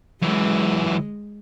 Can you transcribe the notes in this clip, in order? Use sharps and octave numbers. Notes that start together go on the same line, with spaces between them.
F#2 E3 G#3